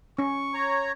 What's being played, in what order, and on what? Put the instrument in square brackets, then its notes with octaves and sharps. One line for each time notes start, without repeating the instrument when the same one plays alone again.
[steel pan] C#4 [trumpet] C#6
[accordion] C#5 A#5